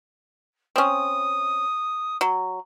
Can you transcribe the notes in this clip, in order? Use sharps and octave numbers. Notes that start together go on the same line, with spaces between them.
C4 C#4 D#6
F#3